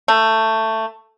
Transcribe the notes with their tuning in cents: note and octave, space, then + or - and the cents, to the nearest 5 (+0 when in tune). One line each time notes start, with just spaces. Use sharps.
A3 +15